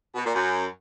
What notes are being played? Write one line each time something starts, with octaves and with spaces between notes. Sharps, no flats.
B2
A#2
F#2